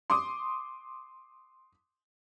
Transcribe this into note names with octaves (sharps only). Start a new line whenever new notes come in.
C6 D6 D#6